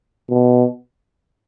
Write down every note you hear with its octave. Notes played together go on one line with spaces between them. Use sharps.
B2